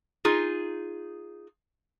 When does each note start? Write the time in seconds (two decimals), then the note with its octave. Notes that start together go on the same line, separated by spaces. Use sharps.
0.25 D#4 F4 G#4